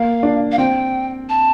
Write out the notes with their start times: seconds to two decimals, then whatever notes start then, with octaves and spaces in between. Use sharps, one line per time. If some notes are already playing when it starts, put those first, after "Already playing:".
Already playing: A#3 F5
0.23 D4
0.52 F5
0.58 C4 G5
1.29 A5